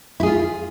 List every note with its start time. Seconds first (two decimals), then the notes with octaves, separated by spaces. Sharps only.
0.20 E4
0.23 G#4
0.26 F4